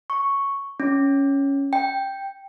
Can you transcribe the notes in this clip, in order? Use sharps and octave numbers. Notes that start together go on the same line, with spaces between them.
C#6
C#4
G5